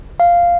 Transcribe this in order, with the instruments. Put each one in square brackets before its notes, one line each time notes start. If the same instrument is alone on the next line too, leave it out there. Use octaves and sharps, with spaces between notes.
[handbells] F5